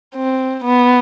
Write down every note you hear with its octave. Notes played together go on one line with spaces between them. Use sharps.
C4
B3